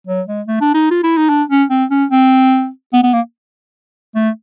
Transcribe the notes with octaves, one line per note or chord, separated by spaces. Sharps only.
F#3
G#3
A3
D4
D#4
F4
E4
D#4
D4
C#4
C4
C#4
C4
B3
B3
A#3
A3